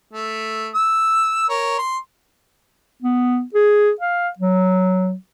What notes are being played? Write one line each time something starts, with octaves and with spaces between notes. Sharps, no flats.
A3
E6
A#4 C#5
C6
B3
G#4
F5
F#3